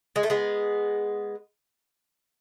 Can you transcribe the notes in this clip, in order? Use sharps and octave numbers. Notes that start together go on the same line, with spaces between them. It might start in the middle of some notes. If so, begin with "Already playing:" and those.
G#3
A3
G#3 B3